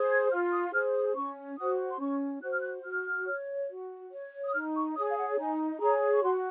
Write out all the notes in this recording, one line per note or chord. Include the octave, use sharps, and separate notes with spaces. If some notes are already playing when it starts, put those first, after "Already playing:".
Already playing: G#4 C5
G#6
F4 F6
D#6
G#4 C5 F6
D#6
C#4 C#6
F#4 C5 D#6
C6
C#4 C#6
F#4 C5 F#6
F6
F#6
F#4 F6
C#5
F#4
C#5
D#6
D#4 F6
C#6
G#4 C#5 D#6
F5
F#5
D#4 G#5
G#4 C#5 A#5
C#6
F#4 C6